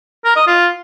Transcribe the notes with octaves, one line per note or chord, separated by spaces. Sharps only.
A#4
D#5
F4